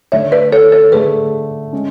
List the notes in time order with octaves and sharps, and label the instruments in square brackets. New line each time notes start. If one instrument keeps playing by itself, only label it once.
[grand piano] D3 A3 D4 [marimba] C#5 E5
[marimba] B4 D5
A4 C#5
A4 C#5
[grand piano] D3 A3 D4 [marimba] G#4 B4
[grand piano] G#3 C#4